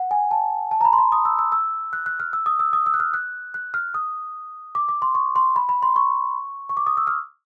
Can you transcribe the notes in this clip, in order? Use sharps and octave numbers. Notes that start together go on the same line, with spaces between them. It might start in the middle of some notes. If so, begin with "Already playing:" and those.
Already playing: F#5
G#5
A5
A5
A#5
B5
C6
B5
D#6
E6
E6
E6
F#6
F#6
F6
E6
D#6
E6
D#6
E6
F#6
F6
F#6
F#6
F6
D#6
D6
D6
C6
C#6
C6
B5
B5
C6
C#6
C#6
D6
D#6
E6
F6